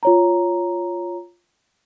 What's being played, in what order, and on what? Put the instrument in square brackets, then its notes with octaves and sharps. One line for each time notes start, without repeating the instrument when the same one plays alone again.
[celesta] F4 C#5 A#5